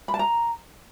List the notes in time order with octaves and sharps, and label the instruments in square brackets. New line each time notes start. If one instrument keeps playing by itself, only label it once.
[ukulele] B5
A5
A#5